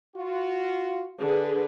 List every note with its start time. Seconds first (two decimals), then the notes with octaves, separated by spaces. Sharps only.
0.16 F4 F#4
1.20 D3 G#4 B4